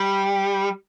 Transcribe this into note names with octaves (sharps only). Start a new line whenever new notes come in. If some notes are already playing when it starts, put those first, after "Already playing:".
Already playing: G3